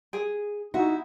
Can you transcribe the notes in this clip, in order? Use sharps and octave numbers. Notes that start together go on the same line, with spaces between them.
G#4
D#4 E4 F#4